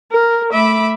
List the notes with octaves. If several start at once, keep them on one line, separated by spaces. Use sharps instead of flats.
A#4
A3 E5 B5 D6